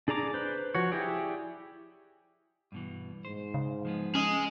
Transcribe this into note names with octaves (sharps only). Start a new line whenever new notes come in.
D4 G#4 D5 A#5 D6
B4 C5
F3 F#4 C#5
E4 G4 G#4 D5
G2 B2 E3
G#2 C5
C#3
F3 G#3 B3
C#4 G#4 D#5